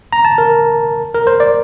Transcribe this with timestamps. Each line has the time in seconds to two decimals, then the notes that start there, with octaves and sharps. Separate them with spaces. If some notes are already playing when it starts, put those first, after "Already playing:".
0.13 A#5
0.25 A5
0.38 A#4
1.14 A#4
1.27 C5
1.40 D5